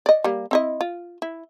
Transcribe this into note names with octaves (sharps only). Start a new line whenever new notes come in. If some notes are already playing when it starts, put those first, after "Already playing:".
D5 D#5
G3 A#3
C4 E4 D#5
F4
E4